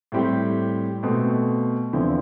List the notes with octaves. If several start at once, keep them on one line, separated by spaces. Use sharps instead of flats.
A2 G3 C4 G4
B2 A3 C4
E2 D3 F3 C4 E4